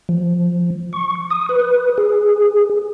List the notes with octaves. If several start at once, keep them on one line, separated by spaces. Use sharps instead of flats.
F3
C#6
D#6
B4
G#4